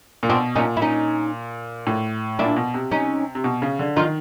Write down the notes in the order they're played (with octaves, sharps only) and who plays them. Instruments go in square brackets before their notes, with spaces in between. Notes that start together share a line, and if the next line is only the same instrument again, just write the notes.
[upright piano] A#2
[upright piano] B2 [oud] C4 D4
[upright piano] A#2 [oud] C#4 D#4
[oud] E4
C#4 D#4
[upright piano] A2
[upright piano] A#2 [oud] D4 E4
[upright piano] B2
C3
[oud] C#4 D#4
[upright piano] C3
B2
C#3
D3
[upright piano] D#3 [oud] D#4 F4